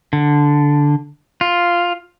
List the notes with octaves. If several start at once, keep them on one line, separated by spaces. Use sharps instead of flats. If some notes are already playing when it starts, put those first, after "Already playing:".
D3
F4